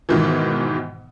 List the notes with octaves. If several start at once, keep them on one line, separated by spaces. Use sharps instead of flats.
G#2 B2 D#3 E3